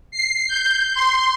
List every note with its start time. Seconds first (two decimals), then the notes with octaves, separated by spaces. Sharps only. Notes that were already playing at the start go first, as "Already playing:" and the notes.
0.11 C7
0.48 G6
0.94 C6